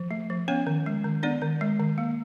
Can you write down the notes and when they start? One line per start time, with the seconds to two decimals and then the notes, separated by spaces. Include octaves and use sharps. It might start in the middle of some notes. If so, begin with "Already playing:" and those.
Already playing: F3
0.11 A3
0.30 F3
0.48 B3 C#4 C#5
0.67 D#3
0.86 G#3
1.04 D#3
1.23 B3 D4 D5
1.42 D#3
1.61 G#3
1.80 D#3
1.98 A#3